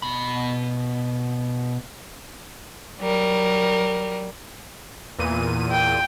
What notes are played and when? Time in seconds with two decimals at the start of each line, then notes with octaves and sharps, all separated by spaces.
0.02 B2 B5
3.01 F#3 G3 A#4
5.19 E2 A#2 D#7
5.72 G5